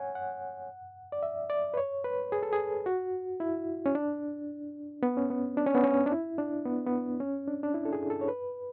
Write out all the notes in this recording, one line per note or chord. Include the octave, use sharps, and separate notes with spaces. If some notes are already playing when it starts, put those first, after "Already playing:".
Already playing: C#5 F#5 G#5
F#5
D5
E5
D5
B4
C#5
B4
G#4
A4
G#4
F#4
E4
C#4
D4
B3
C#4
B3
D4
C#4
B3
C#4
D4
E4
D4
B3
B3
C#4
D4
D4
E4
A4
G#4
A4
C#5
B4